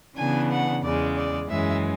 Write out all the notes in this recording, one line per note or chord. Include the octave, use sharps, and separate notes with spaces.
C#3 E3 B3 D4 G#5
F#5
E2 C#3 G#3 D5
D5
F#2 E3 G#3 C#4 E5